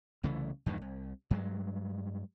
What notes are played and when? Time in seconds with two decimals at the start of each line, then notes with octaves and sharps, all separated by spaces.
0.23 C2 C#3 E3 A3
0.66 E2 G2 A#2 D#3
0.82 C2
1.31 G2 F#3 G#3